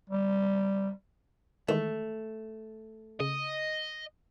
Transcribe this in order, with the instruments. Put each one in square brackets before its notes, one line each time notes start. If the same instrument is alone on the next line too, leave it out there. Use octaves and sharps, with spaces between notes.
[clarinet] G3
[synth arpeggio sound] D#3 E3 G#3 [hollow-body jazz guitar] A3
[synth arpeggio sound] C#3 [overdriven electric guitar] D#5